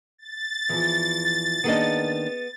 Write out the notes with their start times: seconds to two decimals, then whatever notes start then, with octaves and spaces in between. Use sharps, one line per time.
0.18 A6
0.69 E2 E3 F3
1.64 D#3 A#3 B3 D4 G#4 D#5